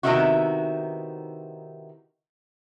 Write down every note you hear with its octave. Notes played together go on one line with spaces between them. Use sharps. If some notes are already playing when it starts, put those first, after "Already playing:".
C3 D#3 B3 D#4 E4 F#4